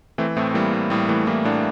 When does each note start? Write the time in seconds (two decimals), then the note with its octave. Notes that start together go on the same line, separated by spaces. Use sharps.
0.18 E3 A3 C4
0.37 A2 A3 C4
0.54 E3 G3 A#3
0.73 A2
0.90 A2 G3
1.09 E3 A3
1.27 E3 G3 A#3
1.45 A2 A#3 D4